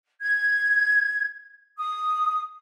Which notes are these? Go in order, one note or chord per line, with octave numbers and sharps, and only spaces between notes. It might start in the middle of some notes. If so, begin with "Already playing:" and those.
G#6
D#6